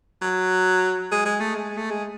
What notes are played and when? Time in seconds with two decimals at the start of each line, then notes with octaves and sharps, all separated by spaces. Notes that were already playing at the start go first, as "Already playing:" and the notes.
0.21 F#3
1.11 G#3
1.25 G#3
1.40 A3
1.55 G#3
1.77 A3
1.90 G#3